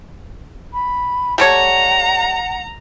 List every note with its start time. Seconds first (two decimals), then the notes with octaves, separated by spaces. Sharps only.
0.73 B5
1.38 G3 A3 C#5 F#5 A#5